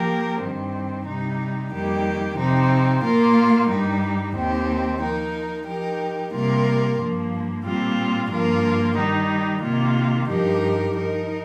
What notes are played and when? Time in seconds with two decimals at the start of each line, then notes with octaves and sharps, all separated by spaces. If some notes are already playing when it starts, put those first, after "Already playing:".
Already playing: F3 A#3 G4 A#4
0.41 G2 D#3 G3 C4
1.06 C3 G3 D#4
1.72 F2 D#3 G3 A#3 G4
2.38 C3 F3 C4 D#4
3.04 A#2 A#3 F4 A#4
3.69 G2 G3 D#4
4.35 D#2 D#3 C4 G4
5.02 F3 D#4 A#4
5.67 F3 D#4 G4 A#4
6.33 C3 G3 A#3 F4 A#4
6.99 G2 F3 A#3
7.65 A#2 G3 C4 F4
8.30 G2 F3 A#3 F4 A#4
8.96 D#3 G3 D#4
9.62 C3 D#3 A#3 F4
10.28 G2 F3 D#4 G4 A#4
10.93 F3 D#4 A#4